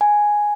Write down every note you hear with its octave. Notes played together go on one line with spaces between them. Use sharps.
G#5